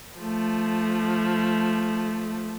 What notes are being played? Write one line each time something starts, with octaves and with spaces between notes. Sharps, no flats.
F3 A3